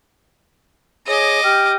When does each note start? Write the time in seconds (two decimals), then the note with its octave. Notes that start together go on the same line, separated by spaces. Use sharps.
1.07 G#4 C#5 D#5 D6
1.43 G4 G5 F6